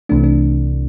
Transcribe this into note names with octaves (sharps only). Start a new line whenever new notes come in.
C2 C3 E3 A3 D4
D4